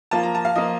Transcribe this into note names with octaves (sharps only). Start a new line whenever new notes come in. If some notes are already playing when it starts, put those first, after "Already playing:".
F3 A#3 F4 A5
A#5
A5
F5
F3 A#3 F4 D#5